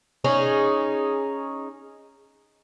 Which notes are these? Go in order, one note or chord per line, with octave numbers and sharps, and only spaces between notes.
C#4 D#4 G#4